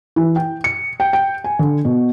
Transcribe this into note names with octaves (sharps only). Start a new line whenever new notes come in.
E3
G5
C#7
G5
G5
G#5
D3
B2